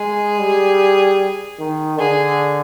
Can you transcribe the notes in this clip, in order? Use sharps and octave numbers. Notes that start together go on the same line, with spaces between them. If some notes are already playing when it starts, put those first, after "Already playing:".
Already playing: G#3 G#4
G3
D#3
D3 G#4